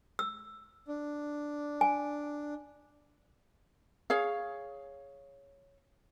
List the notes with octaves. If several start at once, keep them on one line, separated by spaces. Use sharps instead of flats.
E6
D4
G#5
G#4 C#5 F5